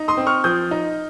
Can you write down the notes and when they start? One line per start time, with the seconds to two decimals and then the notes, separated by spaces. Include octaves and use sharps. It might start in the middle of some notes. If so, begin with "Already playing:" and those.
Already playing: D#4
0.08 C6 D#6
0.17 C4
0.27 C#6 F6
0.44 F3 D#6 G6
0.71 D#4